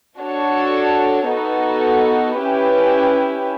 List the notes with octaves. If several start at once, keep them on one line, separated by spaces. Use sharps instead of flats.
D4 F#4 A4 C#5
B3 D#4 F#4 A4
C#4 E4 G4 B4